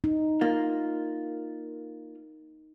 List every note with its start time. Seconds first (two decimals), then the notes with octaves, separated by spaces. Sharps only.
0.04 D#4
0.41 A#3 F4